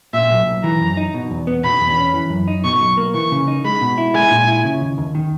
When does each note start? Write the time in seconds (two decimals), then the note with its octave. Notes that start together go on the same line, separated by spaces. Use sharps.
0.13 A#2 E5
0.31 B1
0.47 B1
0.64 E3 A#5
0.81 F#2
0.97 D#4
1.14 B2
1.31 E2
1.47 B3
1.64 B2 B5
1.81 E2
1.98 C#4
2.14 E3
2.30 F#2
2.48 D#4
2.64 B2 C#6
2.81 B1
2.97 A#3
3.14 E3 C#6
3.32 C#3
3.48 D#4
3.65 G#3 B5
3.81 B2
3.98 E4
4.15 G#3 G#5
4.31 A#2
4.48 E4
4.65 C#3
4.81 D#2
4.98 D#2
5.15 D#3